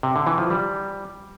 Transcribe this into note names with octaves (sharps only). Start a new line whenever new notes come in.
C3
D3
E3
F3
G3